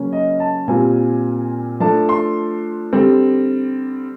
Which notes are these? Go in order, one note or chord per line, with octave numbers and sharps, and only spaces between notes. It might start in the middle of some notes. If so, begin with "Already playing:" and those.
Already playing: C#3 F#3 A#3 C#4
D#5
A5
A#2 G3 C4 F4 G#5
F3 A3 D4 A5
C6
D3 G3 C4